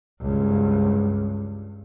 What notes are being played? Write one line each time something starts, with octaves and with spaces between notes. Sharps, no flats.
C#2 G2